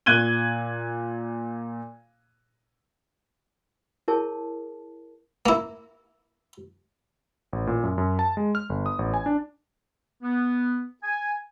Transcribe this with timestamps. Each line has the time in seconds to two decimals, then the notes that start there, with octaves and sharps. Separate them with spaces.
0.06 A#2 F#6 G#6 D#7 G7
4.08 E4 G#4 A#4 C#5 A5
5.46 A#3 E4
7.53 A1
7.67 A#2
7.83 F#2
7.98 F#2
8.19 A5
8.37 G#3
8.55 F6
8.70 G1
8.86 D#6
8.99 A1
9.14 G#5
9.26 D4
10.23 B3
11.03 G#5